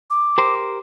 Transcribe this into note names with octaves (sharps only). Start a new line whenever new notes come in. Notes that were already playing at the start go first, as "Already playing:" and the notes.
D6
G4 A#4 C5